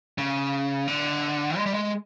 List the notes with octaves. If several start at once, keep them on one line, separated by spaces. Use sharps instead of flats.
C#3
D3
G#3
G3
G#3